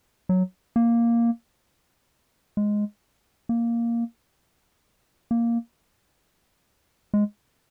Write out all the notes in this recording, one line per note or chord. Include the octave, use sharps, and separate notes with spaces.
F#3
A#3
G#3
A#3
A#3
G#3